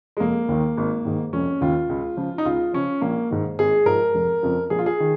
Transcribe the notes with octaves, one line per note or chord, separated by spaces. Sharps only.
G#3
F1 A#3
D#2 D#3
G#1
G#2 D#3
F1 C#4
D#2 C#3 F4
C#2
C#3 F3
D#4
C#2 F4
C#3 F3 C#4
A#1 A#3
G#2 D#3
G#1 G#4
G#2 F3 A#4
F1
F2 C#3 F3
A#1 G#4
F4
G#4
D#3